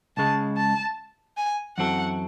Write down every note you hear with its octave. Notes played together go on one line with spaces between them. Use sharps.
C#2 C#3 G#3 A5
A5
G#5
F#2 E3 C4 F#4 A4 F#5